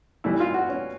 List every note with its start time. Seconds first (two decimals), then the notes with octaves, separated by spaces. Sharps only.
0.24 A2 E3 G3 E4
0.40 F4
0.54 F#4
0.69 C#4